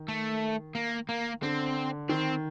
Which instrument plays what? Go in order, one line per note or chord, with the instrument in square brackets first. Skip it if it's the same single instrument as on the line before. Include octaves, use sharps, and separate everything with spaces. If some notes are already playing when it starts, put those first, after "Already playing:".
Already playing: [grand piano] D#3
[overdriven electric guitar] A3
A#3
A#3
[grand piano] D3 [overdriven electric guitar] C4
[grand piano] D#3 [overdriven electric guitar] C4